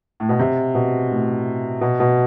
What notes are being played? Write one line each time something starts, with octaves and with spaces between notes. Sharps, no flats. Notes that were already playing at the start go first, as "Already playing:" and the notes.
A2
B2
C3
B2
A2
B2
B2